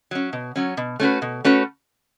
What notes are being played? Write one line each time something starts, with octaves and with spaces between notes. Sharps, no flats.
F#3 C#4
B2
F#3 C#4
B2
A3 C#4 F#4 B4
B2
A3 C#4 F#4 B4